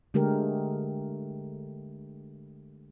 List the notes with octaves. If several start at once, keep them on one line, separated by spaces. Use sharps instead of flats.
D3 G#3 A3 G4 A#4